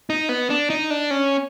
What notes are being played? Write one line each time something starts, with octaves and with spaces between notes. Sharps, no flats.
D#4
B3
D4
D#4
D4
C#4